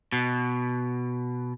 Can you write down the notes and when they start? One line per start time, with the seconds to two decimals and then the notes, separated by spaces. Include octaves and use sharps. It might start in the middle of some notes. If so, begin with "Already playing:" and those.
0.12 B2